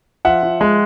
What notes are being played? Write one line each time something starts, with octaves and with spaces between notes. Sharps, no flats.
F3 E5 F#5
F3
G#3